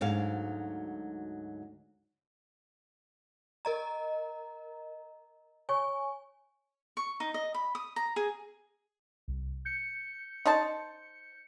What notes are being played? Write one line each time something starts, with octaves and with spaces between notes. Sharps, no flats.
D2 G#2 F#3 F5
A#4 D#5 A#5
C#5 G#5 C#6
C#6
D#4
D#5
B5
D#6
A#5
G#4
C2
G6 C#7
D#4 C5 A5